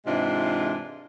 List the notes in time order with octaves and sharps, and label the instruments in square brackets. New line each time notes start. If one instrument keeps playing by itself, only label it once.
[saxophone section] G#2 C3 E3 G#3 D4 F4